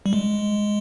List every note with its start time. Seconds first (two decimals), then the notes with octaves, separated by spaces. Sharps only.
0.06 G3
0.13 G#3